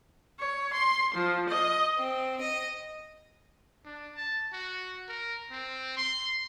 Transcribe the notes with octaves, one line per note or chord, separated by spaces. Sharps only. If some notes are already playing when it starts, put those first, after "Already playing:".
C#5
C6
F3
D#5
C4
D#5
D4
A5
F#4
A#4
C4
C6